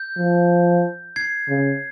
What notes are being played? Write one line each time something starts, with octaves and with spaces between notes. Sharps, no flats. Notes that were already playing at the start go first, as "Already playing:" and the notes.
Already playing: G6
F3
G#6 C7
C#3